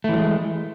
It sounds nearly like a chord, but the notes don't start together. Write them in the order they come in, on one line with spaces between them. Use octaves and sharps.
A3 E3 F#3 G#3